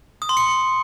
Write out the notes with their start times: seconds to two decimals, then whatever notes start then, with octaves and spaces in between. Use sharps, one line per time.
0.22 D#6
0.29 C6
0.37 C#7